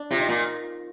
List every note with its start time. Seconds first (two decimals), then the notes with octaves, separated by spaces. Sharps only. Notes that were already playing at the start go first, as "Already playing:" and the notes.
Already playing: D4
0.11 C3 F4
0.20 D#4
0.29 A#2